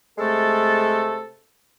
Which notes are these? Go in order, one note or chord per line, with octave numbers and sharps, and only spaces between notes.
C3 G#3 A3 A4